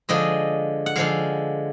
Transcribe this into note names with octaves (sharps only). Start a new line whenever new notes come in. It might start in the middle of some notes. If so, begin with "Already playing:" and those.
D3 F3 G#3 D#5
F#5
D3 F3 G#3 F5